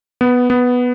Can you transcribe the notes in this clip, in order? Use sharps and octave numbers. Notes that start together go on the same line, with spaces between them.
B3
B3